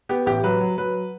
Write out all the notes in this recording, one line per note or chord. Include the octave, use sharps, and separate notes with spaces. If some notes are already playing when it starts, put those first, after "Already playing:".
B3 G4
A1 G4
F#3 B4
F#3
F#3 B4